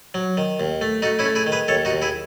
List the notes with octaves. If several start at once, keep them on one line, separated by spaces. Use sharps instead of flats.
F#3
D#3
D#2
A3
A3 D#4 F#4
C#4 E4
A3
E4 G#4
D#3
G#4 B4
D#2 A4 C#5
D#4 F#4
D#2
E4 G#4